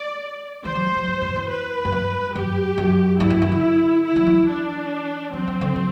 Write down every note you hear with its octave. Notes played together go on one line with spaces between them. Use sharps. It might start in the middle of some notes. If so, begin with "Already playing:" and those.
Already playing: D5
E3 C5
F#3
G3
F#3
G2
F#2
E2
B4
F#2
G2
F#2 G4
F#2
G2 E4
F#2
F#2
D3
E4
F#3
F#3
E3
D4
F#3 C4
F#3
D3
F#3